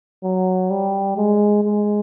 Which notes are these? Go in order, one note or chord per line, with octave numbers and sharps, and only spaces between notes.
F#3
G3
G#3
G#3